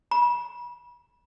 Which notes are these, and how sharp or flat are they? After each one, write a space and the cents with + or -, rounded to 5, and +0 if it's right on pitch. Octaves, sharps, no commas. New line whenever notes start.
B5 -35